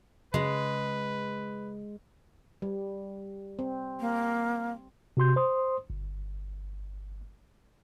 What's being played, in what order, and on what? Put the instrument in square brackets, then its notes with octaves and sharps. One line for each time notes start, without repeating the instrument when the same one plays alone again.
[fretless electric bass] C#3 [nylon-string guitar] G#3 [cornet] B4
[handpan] G3
C4
[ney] A#3
[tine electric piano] C3 F#4 C6 G6
C5 C6 D#6
G1